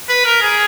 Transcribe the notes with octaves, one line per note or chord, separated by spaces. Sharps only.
B4
A#4
G#4